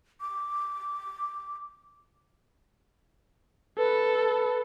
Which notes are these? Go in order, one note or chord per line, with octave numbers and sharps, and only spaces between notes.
D6
A4 B4